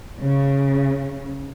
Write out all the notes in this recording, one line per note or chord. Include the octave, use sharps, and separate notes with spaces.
C#3